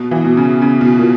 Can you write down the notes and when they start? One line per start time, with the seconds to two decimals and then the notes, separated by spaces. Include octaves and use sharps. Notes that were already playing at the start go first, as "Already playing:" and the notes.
Already playing: B2
0.11 E3
0.25 B2
0.37 C#3
0.62 C#3
0.81 B2
0.99 A#2